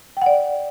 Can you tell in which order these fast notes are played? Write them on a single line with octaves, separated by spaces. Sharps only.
G5 F#5 D5